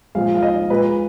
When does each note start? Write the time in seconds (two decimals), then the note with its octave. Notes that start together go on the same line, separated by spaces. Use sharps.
0.15 A#2 F3 G#3 F5
0.37 F5
0.43 D#5
0.70 A#2 G#3 B4